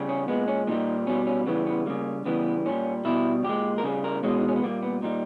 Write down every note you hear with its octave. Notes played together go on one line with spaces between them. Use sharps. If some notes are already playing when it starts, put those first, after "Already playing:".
Already playing: C#3 G3
C#4
A#2 G#3 B3
C#4
A#2 G3 D#4
B2 G3 C#4
C#4
C#3 E3 G3 B3
B3
C#3 G3 A#3
C#3 E3 G3 B3
A#2 G3 C#4
B2 G3 E4
A#2 G#3 G4
A#4
C#3 G3 G#4
A#4
B2 G#3 C#4
D#4
C#4
B3
A#2 G3 A#3
B3
A#2 G3 D#4